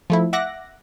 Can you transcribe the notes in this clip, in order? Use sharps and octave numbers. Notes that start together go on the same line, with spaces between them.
F3 A3 E4
E5 F#5 D6 F#6 A#6